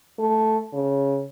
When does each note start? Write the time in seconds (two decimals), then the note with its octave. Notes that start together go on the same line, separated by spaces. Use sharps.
0.19 A3
0.73 C#3